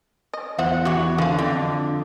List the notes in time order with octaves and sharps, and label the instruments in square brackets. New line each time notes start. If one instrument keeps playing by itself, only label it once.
[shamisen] D#5
[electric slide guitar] E2 [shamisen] F4 C5 E5 [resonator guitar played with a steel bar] F#5
[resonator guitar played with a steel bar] E3 F#4 [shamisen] G4
[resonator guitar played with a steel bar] D3 [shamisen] F4 F5
[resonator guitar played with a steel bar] F2 [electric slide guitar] D3